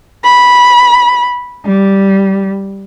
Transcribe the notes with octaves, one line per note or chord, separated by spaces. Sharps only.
B5
G3